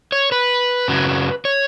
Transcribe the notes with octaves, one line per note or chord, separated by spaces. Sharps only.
C#5
B4
F#2 C#3 F#3
C#5